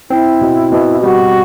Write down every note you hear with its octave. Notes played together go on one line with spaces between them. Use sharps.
C4 E4
B2
B2
G4
G3 F#4